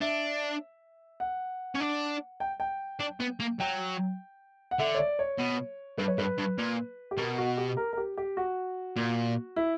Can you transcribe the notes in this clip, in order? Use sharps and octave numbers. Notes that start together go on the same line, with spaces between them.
D4 E5
F#5
C#4
D4
G5
G5
D4
B3
A#3
F#3 G5
F#5
D3 E5
C#5
D5
C#5
B2
G2 B4
C#5
G2 B4
G2
A#2
G4
B2 A#4
F#4
G4
A#4
A#4
G4
G4
F#4
A#2
E4